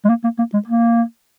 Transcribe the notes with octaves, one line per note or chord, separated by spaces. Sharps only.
G#3
A#3
A#3
A#3
G#3
A#3